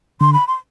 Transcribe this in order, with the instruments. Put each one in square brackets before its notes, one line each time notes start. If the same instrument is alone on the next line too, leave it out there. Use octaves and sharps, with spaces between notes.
[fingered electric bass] D3 [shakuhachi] C6
[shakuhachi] B5
C6